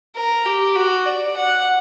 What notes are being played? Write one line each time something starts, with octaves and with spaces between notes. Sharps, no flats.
A#4
G4
F#4
D5
F#5